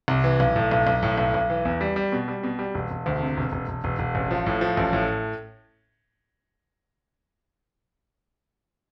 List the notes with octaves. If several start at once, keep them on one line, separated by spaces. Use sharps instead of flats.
C2
E3
B1
A2
B1
B1
A2
B1
B1
E3
E2
G3
G3
B2
G3
B2
G3
E1
E1
D2
C3
E1
E1
E1
E1
E1
A1
F3
A2
F3
A1
A2